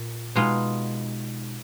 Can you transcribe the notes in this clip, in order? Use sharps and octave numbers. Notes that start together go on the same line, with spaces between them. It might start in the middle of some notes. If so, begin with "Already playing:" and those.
Already playing: A#2
B2 G#3 D#4 F4